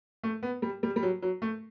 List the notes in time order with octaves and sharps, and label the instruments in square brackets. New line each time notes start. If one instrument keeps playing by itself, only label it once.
[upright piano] A3
B3
G3
G3
G3
F#3
F#3
A3